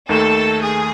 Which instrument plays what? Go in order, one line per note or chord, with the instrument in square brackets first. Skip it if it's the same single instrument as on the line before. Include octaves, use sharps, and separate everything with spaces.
[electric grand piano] D#2 D#3 A3 [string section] A4
[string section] G#4